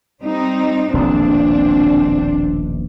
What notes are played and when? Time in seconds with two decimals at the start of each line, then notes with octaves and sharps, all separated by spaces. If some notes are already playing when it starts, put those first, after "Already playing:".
0.23 G3 C4 D#4
0.94 D#1 A#1 B2 C4 D4